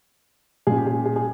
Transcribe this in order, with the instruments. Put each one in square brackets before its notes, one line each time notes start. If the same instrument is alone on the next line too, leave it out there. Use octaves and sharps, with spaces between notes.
[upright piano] A#2 G3 C#4 G#4
G4
G#4
G#4
G#4